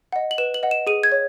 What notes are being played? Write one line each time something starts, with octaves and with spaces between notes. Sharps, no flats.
D#5 F#5
F#7
B4 E7
F#7
D#5 F#5
E7
G#4 D#7
G#6
C#5